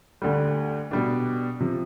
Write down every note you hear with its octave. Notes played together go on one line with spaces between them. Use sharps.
D2 D3 G3
B2 G3 D4
C3 F3